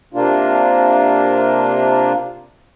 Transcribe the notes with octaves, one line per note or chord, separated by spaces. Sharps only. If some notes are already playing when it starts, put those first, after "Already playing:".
C3 A#3 D4 F4